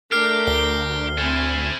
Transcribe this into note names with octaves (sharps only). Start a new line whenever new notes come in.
A3 D4 G4 A#4 F6 C7
D2 G7
A3 C4 E4 G#5